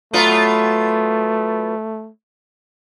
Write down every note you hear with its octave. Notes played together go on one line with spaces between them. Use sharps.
F#3 A3 B3 F4